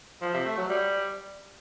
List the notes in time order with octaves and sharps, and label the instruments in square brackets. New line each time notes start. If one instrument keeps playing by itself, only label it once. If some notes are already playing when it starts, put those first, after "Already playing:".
[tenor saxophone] F3
C3
A3
F#3
G3